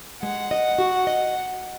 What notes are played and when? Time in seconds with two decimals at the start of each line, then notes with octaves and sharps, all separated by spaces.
0.23 G#3 F#5
0.51 D#5
0.78 F#4
1.07 D#5